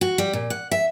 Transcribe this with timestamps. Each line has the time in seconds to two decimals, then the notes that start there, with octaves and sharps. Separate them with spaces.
0.01 F#4
0.18 G3
0.33 A#2
0.50 F#5
0.71 E5